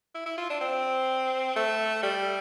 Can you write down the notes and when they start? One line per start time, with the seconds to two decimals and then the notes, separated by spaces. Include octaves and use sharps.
0.15 E4
0.26 E4
0.38 F4
0.50 D4
0.61 C4
1.56 A3
2.03 G3